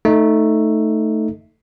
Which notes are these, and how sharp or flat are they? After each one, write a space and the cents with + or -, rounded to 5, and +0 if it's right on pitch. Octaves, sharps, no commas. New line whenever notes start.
A3 +5 D#4 +0